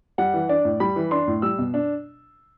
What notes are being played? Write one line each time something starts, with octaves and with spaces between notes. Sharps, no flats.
G3 F#5
E3
D4 D5
A2
G3 B5
E3
D4 C6
A2
G3 E6
B2
D4